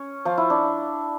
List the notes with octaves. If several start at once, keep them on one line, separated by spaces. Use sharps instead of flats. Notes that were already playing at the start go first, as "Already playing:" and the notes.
Already playing: C#4 C#5
F3 F4
E4
D4